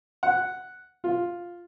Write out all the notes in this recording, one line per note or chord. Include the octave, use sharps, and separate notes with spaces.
F#5
F4